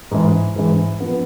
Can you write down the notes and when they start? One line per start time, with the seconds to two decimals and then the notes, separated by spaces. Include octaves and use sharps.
0.11 G#2 E3 G#3
0.56 G#2 E3 G#3
1.00 F3 B3